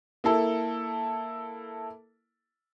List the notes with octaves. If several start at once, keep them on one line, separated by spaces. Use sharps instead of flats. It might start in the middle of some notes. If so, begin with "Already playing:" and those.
A#3 E4 A4